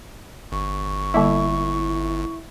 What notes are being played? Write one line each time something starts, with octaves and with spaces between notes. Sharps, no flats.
G1 C#6
D3 G3 A#3 E4